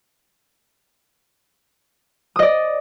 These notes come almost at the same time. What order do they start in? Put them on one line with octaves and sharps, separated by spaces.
D#6 D#5 D5